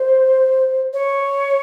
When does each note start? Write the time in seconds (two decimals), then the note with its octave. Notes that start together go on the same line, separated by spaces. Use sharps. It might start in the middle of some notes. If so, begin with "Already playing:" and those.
Already playing: C5
0.93 C#5